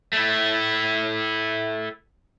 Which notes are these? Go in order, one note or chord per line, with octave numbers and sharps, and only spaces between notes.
A3 E4